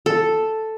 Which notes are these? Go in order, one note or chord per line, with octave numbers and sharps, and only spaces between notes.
A4